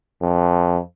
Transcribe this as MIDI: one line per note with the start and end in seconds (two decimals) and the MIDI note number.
0.21 0.79 41